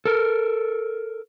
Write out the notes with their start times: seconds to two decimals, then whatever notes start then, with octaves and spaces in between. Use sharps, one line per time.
0.05 A4 A#4